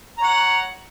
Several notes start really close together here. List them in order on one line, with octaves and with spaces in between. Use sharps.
A#5 C#5 F#5